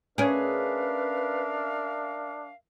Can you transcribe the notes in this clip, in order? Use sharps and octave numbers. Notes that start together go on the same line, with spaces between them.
C#4 D4 G#4 A#4 B4 E5 F5